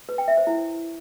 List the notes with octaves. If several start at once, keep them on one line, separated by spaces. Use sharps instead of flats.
B4
G5
E5
C5
E4